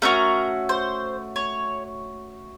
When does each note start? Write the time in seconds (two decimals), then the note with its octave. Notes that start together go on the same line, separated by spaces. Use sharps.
0.02 A3 C#4 F#4 A#4
0.69 C5
1.36 C#5